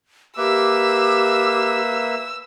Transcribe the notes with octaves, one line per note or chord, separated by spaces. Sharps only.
A#3 G4 B4 E5 D6 E6